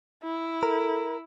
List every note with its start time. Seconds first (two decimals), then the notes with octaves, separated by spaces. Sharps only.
0.24 E4
0.63 A4 A#4